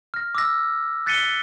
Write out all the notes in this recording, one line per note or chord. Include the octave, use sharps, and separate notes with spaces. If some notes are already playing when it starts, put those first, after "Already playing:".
F6 A#6
D6 E6 A#6
F#6 A6 B6 C#7 D#7 G7